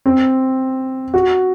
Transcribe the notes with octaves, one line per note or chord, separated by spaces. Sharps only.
C4
F#4